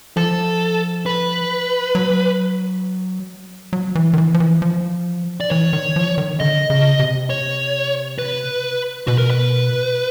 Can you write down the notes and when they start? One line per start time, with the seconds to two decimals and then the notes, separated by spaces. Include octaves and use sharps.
0.17 F3 A4
1.06 B4
1.95 F#3
3.73 F#3
3.95 E3
4.13 D#3
4.18 E3
4.34 F3
4.40 E3
4.62 F3
5.41 D5
5.51 E3 C#5
5.73 D#3
5.96 F3
6.18 D#3
6.40 D3 D#5
6.70 C#3
7.00 C3
7.30 C#5
8.19 B4
9.08 B2 B4
9.18 A#4
9.30 B4